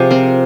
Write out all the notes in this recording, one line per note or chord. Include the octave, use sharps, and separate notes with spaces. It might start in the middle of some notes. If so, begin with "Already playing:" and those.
Already playing: C3 F3 G#4
C4 A#4